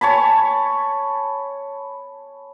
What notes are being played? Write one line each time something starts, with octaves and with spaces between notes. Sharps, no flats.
C#5 G#5 A5 B5